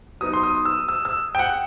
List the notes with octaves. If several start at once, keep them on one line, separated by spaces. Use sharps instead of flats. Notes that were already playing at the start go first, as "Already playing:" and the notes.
F#3 B3 D#4 D#6
C6
D#6
E6
E6
E6
G5
F#5